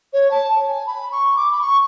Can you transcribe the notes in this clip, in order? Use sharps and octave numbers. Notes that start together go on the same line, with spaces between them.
C#5
A5
G#5
B5
C#6
D6
B5
C#6